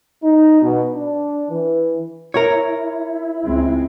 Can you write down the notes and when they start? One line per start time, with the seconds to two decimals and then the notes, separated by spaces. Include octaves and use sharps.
0.24 D#4
0.62 B2
0.94 D4
1.50 E3
2.34 E4 A#4 C#5
3.45 C#2 G#3 C4